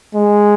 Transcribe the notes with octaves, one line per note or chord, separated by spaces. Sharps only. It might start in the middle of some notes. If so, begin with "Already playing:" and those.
G#3